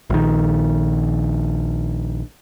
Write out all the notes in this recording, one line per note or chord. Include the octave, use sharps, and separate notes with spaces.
A#1 D#3